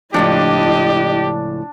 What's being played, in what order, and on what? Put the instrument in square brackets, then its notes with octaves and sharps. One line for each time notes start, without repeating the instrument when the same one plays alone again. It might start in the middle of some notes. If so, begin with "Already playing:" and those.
[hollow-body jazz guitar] C#2 A2 F3 [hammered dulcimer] D4 [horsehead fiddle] E4 D#5 [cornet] G4